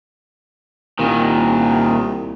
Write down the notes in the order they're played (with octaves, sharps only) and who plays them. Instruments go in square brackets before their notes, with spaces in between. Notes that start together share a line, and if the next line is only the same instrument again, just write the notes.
[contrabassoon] C2 [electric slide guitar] A#2 D#3